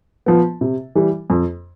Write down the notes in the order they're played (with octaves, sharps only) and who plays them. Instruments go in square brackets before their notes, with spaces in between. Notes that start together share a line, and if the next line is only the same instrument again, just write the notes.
[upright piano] F3 B3
C3
E3 G3
F2